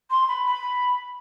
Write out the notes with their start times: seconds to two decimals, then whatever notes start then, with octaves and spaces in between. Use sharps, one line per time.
0.10 C6
0.28 B5
0.46 B5